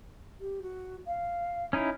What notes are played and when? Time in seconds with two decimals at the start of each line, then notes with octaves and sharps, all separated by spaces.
0.40 G4
0.62 F#4
1.07 F5
1.73 C#4 D#4 E4